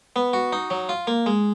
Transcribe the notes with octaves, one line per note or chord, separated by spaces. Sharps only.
B3
F#4
D#4
F#3
F4
A#3
G#3